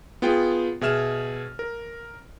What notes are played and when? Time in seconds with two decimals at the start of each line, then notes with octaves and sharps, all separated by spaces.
0.22 B3 F4 G#4 G5
0.81 B2 G#4 E5 F6 E7
1.59 A#4